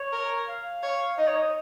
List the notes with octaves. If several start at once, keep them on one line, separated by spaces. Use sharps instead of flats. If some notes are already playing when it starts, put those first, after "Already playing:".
Already playing: C#5
A#4
F5
C#5
D#4 D#5
C#5
D#5